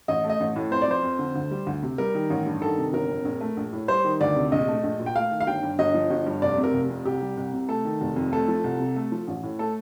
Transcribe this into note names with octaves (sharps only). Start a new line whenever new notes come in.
A1 D#5
A3
D#5
A1
A2
F2 C5
D5
F3 C5
F2
D3
D2
G3
D2
C3
G3 A#4
D#3
A1
G2
D#3 A4
C3
G1 A#4
F2
A#1
A3
A#1
A2
G3 C5
D#3
D2 D5
C3
A#1 D#5
A3
A#1
A#2
G5
A3 F5
D#3
F5
G1 G5
G2
G1 D#5
F3
G1
G2
F1 D5
C3
A#4
F1
F2
C2 G4
G3
C2
C3
A3 A4
D#3
F1
F2
A3 A4
F3
C2
C3
A3
F3
A1
A2
A3 A4